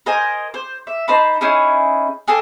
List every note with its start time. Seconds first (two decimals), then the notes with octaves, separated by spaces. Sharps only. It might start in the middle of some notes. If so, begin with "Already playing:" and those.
0.06 A#4 C5 D#5 G#5
0.54 C5
0.87 E5
1.08 D#4 C5 A5 B5
1.41 C#4 D#4 E4 G#4
2.28 G#4 A4 D#5 G5